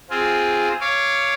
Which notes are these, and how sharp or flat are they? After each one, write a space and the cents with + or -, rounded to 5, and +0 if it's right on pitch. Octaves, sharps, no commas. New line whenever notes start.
C4 +0 F4 +0 G#4 +0
C#5 +5 F5 -20 D6 +0